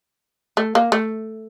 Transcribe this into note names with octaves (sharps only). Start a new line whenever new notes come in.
A3
A#3
A3